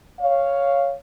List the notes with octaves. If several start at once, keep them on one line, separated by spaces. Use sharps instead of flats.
C#5 F5